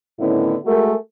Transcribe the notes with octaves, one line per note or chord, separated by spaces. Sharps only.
A2 D3 D#3 B3 C#4 E4
G#3 A3 F#4 G#4 A#4